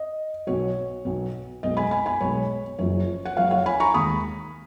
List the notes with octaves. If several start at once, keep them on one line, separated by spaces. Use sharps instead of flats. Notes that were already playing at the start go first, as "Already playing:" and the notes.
Already playing: D#5
B1 B2 F#3 C#5
B1 B2 F#3
B1 B2 G#3 D#5
G#5 B5
G#5 B5
G#5 B5
B1 B2 G#3 C#5
F#1 F#2 F3 C#5
F#5
F#1 F#2 F3 C#5 F5
C#5 F5
G#5 B5
A#5 C#6
D#2 D#3 G#3 B5 D#6